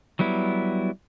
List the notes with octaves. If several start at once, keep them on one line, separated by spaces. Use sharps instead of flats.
F#3 G3 B3 E4